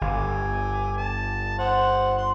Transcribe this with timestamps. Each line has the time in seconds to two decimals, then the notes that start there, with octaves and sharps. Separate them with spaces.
0.01 G1 G#5 D6
0.97 A5
1.59 C5 F#5
2.18 C6